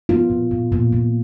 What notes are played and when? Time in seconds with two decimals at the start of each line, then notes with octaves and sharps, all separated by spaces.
0.09 B3 F4
0.30 A#2
0.51 A#2
0.72 A#2
0.93 A#2